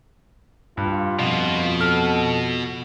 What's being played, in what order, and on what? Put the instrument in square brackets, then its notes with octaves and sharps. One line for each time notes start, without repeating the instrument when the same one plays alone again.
[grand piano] G2 [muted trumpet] F4
[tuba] F2 [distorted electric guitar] B2
[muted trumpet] A4 [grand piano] F6